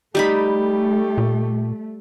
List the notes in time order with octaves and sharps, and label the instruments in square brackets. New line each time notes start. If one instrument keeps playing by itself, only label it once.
[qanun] G3 D#4 B5 [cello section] A3 [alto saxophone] G4
[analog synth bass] A#2